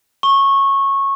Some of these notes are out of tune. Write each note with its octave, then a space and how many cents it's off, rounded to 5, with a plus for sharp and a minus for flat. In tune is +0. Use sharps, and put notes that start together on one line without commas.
C#6 -15